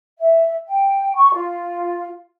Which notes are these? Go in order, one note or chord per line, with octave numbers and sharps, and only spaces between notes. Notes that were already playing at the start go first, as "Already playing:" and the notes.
E5
G5
C#6
F4